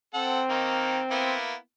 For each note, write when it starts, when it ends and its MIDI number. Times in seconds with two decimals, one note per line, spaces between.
0.14 1.36 60
0.14 0.41 69
0.14 0.41 78
0.49 0.99 51
0.49 0.99 58
0.49 0.99 63
1.11 1.54 58
1.11 1.54 59
1.11 1.54 64